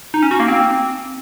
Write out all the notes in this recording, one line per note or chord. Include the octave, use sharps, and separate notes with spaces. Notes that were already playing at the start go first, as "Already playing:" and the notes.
D#4
C#4
F#4
A#3
C4